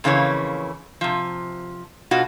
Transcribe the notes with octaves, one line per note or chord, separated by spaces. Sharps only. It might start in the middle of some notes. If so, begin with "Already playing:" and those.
F2 C#3 E3 A#3 C#5
C3 F3
B2 F4 F#4